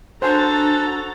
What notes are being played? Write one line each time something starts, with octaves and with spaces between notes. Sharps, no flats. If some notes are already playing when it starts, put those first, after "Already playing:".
D4 F#4 A4 C5 G#5 A#5 A6